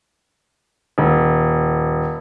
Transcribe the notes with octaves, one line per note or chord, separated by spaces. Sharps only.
D#1